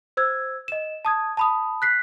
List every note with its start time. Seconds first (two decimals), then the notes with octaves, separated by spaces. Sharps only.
0.17 C5 E6 G#6
0.68 D#5 E7
1.05 A5 D#6 G#6
1.37 A5 B5 D#6
1.82 F#6 B6 C7